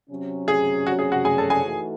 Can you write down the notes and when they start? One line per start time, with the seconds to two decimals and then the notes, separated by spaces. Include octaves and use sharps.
0.10 C3 F#3 C#4
0.48 G#4
0.87 F#4
0.99 G#4
1.12 F#4 F#5
1.25 G#4 G#5
1.38 A4 A5
1.50 G#4 G#5
1.63 E3 A3 D#4 F#4 A4